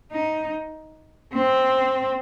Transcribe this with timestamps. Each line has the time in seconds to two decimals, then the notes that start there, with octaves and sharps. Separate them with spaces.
0.12 D#4
1.34 C4